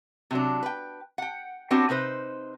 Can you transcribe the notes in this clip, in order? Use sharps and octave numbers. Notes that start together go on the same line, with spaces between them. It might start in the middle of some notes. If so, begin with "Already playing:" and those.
C3 F#3 D4
B4 G5
F#5 G5
B3 C4 D4 F#4 G4 C#5
C3 D#4 B4 C5